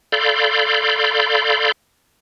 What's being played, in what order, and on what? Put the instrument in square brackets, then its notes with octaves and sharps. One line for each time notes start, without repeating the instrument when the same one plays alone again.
[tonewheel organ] A4 D5 F5 B5 C6 G6